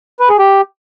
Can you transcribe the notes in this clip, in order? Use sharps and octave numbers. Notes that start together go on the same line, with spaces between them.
B4
G#4
G4